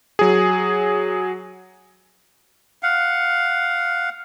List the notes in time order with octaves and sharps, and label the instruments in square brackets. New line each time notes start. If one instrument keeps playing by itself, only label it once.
[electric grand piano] F#3 G#4
[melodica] F5 F#5